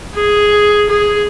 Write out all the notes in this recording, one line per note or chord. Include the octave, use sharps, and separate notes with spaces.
G#4
G#4